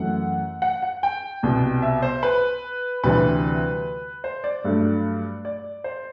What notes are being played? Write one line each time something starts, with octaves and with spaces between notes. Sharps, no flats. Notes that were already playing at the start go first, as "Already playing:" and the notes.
Already playing: F#2 E3 A3 F#5
F#5
F#5
G5
C2 B2 G3 B3
E5
C5
B4
D2 C3 E3 G3 C4 B4
C5
D5
G2 F#3 A3
D5
C5